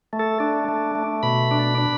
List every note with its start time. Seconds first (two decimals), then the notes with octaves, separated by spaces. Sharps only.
0.13 A3
0.19 A4
0.40 D4
0.69 A3
0.95 A3
1.23 B2 B5
1.51 D4
1.78 D4